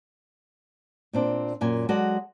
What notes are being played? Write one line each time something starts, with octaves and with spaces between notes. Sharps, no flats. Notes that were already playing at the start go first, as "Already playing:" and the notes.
A#2 C4 D4
F#2 A#2 G#5
F#3 G#3 F#4 A4 D5